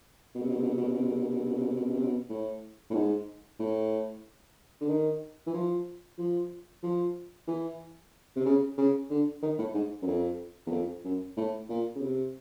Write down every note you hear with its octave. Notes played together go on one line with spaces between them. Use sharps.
B2
C3
B2
C3
B2
C3
B2
C3
B2
C3
B2
C3
B2
C3
B2
C3
B2
C3
B2
C3
B2
C3
B2
C3
B2
A2
A2
G#2
A2
D3
D#3
E3
F3
F3
F3
E3
C3
C#3
C#3
D3
D#3
A2
G#2
F#2
F2
E2
F2
F#2
A2
A#2
C#3
C3